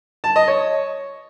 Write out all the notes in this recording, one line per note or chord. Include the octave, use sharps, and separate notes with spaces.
A5
D#5
C#5